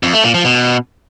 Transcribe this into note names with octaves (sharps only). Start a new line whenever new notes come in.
F2
A3
A#2
F3
B2